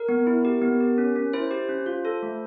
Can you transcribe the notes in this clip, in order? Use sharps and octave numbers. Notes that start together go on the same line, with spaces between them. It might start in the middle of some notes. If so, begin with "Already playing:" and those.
Already playing: A#4
B3
E4
G4
B3
G4
C#4
C#4
E4 C5
G4
C#4
F4
A4
A3